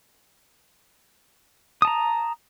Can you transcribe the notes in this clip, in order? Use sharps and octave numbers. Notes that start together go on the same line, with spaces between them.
A5 A#5 D#6